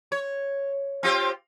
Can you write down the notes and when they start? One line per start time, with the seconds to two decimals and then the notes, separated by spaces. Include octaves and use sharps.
0.12 C#5
1.03 C4 F4 G4